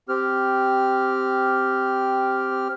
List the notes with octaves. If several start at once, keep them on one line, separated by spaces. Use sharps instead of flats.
C4 G4 F6